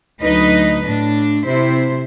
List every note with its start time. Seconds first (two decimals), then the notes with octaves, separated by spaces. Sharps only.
0.21 D2 F#3 D#4 B4 D#5
0.83 A2 D4
1.45 C3 E4 C5